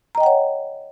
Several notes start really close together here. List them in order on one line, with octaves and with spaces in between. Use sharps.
A#5 D#5 G5 F#5 C#5